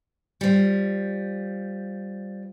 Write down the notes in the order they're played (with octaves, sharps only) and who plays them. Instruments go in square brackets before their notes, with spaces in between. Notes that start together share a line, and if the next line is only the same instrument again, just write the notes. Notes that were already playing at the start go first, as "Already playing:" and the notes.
[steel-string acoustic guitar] F3 G3